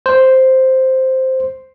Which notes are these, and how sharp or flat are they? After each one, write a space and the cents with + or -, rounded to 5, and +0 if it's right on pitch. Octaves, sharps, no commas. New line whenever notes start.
C5 +0